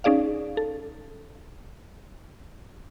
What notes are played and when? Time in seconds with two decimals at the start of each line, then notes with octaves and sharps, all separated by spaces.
0.04 C#4 D#4 G#4 D5 F5
0.57 A4